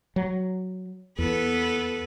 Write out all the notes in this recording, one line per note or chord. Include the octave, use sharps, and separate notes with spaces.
F#3
E2 B3 A4 B4